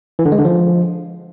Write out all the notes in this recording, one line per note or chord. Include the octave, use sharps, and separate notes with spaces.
E3
D3
G#3
D3
F3